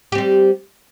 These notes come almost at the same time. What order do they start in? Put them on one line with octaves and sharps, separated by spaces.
G4 C4 G3